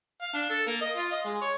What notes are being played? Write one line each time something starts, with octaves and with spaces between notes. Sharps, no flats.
F5
D4
A4
A#3
D#5
F4
D#5
G#3
C#5